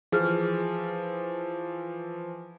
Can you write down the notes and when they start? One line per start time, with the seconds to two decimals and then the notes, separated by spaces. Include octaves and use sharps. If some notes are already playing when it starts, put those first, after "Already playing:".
0.12 E3 F3 G#4 F6